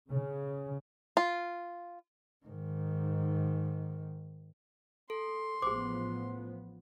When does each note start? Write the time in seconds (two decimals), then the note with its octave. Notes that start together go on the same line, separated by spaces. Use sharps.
0.11 C#3
1.17 F4
2.46 G#2 D#3
5.10 A4 C6
5.62 A1 F3 B3 G#4 C5 D6